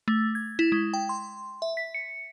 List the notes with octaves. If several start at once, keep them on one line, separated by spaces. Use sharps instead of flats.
A3
G#6
E4
G#3
G5
C6
E5
B6
C#7